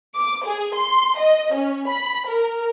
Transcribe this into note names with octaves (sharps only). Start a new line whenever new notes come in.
D6
G#4
C6
D#5
C#4
B5
A#4